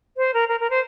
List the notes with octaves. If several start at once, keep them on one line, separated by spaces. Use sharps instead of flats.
C5
A#4
A#4
A#4
C5